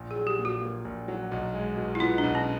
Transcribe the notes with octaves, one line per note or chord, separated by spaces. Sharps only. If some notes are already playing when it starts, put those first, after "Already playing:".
Already playing: A#1
G#4
F#3
G4
A#2
F#4
A#3
A#1
F#3
B1
G#3
B2
E4
B3 F4
D4
B1
C#4